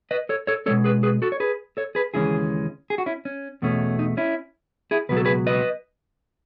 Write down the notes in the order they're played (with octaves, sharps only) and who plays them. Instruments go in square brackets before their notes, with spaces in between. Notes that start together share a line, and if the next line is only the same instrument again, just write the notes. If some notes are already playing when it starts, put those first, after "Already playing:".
[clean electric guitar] B4 D#5
A4 C#5
A4 C#5
B2 G#3 C#4 A4 C#5
G#4 B4
G#4 B4
F#4 A4
C#5
G#4 B4
A4 C#5
G#4 B4
D#2 C#3 E3 G#3 C#4 E4 G#4
G#4
F#4
C#4 E4
C#4
E2 B2 A3 C#4
D#4
C#4 E4
E4 G#4
C#2 B2 F#3 B4
A4
G#4 B4
B4 D#5